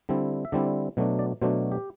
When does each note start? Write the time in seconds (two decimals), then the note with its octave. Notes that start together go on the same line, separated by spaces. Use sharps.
0.09 D3 G3 C4 E4
0.45 E5
0.52 D3 G3 C4 E4 D5
0.97 B2 F#3 A3 D4
1.19 D5
1.42 B2 F#3 A3 D4 C5
1.72 G4